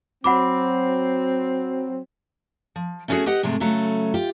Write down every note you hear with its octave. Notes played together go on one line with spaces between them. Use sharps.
F#3 C4 F#5 B5 D6
F3
A3 B3 C#4 F4 F#4 G#4
G4 B4 D#5 F#5
G#2 C3 G#3 A3
C#3 F#3 A3 C#4
F4 G4